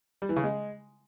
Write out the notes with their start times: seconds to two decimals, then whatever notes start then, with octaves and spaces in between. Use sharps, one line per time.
0.22 G3
0.29 E3
0.36 C#3
0.44 G#3